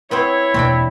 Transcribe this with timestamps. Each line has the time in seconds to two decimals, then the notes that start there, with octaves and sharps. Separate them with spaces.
0.11 B3 C4 E4 C5 C#5
0.54 E2 B2 A#3 C4 D4 G5